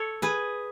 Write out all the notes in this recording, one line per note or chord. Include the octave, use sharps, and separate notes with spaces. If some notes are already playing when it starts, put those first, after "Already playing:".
Already playing: A4 C#5
G#4 B4